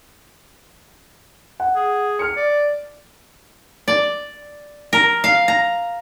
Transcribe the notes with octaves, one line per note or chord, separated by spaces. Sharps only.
F#5
G#4
F6 C#7
D5
D5
A#4
F5
A#5